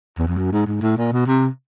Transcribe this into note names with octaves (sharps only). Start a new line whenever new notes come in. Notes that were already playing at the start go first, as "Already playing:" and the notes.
E2
F2
F#2
G#2
G#2
A2
A#2
B2
C3